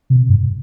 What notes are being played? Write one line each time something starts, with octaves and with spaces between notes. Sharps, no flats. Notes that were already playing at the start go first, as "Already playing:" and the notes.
C3
G2